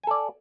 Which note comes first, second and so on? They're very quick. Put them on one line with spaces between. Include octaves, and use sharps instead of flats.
G#5 A4 D5